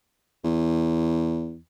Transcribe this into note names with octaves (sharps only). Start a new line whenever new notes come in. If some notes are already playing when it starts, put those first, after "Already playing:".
E2